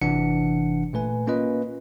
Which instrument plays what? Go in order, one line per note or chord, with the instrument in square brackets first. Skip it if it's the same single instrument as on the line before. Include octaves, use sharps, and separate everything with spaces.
[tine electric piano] G1 C3 E3 D4 F#5 C#7
A#2 A3 B4 G#5
A#3 C#4 F4 B4 D#5